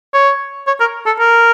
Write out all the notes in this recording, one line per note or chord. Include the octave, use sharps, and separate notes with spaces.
C#5
C#5
A#4
A4
A#4